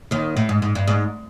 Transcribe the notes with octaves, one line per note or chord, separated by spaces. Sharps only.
D#2 D#3
A2
G#2
G#2
G2
G#2